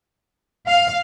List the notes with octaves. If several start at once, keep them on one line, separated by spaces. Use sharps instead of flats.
F5